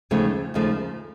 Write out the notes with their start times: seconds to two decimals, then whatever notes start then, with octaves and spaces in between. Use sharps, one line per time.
0.11 D#2 C#3 F3 A3
0.54 D#2 C#3 F3 A3